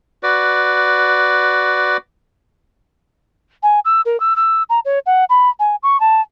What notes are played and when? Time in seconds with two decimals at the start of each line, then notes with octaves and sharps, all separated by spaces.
0.23 F#4 B4 D5
3.63 G#5
3.85 E6
4.05 A#4
4.20 E6
4.36 E6
4.70 A#5
4.85 C#5
5.06 F#5
5.30 B5
5.59 G#5
5.83 C#6
6.00 A5